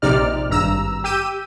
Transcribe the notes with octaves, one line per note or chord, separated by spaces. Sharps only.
A#1 C3 D#4 D5 F6
G#1 G2 A#5 E6
G4 E6 G6 D#7